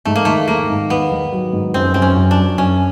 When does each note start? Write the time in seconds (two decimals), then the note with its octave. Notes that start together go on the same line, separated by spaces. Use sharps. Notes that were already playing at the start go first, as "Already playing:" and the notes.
0.05 G#2 A3
0.16 A#3
0.25 D#3 A3
0.48 D#3 A#3
0.69 G#2
0.90 D#3 B3
1.12 D#3
1.33 F#3
1.53 G#2
1.74 F#2 C4
1.94 F#2 C4
2.02 C#4
2.16 F#2
2.31 D4
2.38 F#3
2.58 F#2 C#4